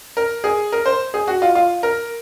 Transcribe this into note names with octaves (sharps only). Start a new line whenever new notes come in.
A#4
G#4
A#4
C5
G#4
F#4
F4
F4
A#4